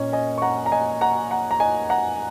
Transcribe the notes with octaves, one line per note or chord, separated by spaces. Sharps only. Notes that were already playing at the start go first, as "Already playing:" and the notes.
Already playing: A#2 A#3 C#4 C#5 D#5
D#5 G#5
C#6
F#5 A#5
A#5
D#5 G#5
F#5 A#5
F#5 A#5
A#5
D#5 G#5
F#5 A#5